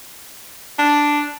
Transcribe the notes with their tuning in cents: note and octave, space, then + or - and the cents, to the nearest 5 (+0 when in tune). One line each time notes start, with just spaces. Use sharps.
D4 +0